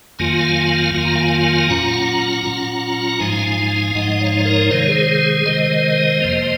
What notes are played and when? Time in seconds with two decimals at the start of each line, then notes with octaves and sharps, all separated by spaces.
0.19 F2 D#3 F#3 A#3 F4 F5 G#5
0.94 F2 D#3 F#3 A#3 F4 G#5
1.05 A#5
1.15 F5 G#5
1.69 A#2 F#3 C#4 F4 F#5 A#5
2.44 A#2 F#3 C#4 F4
3.09 A#5
3.20 G#2 F3 G#3 D#4 F5 G#5
3.95 G#2 F3 G#3 D#4 D#5 F#5
4.20 C#5 F5
4.45 A#4 C#5
4.70 C3 D#3 G#3 C5
4.79 C#5
4.89 G#4 C5
5.46 C3 D#3 G#3 C5 D#5
6.21 F2 C3 F3 A#3